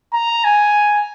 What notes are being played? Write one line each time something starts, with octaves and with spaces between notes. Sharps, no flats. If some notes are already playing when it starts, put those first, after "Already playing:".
A#5
G#5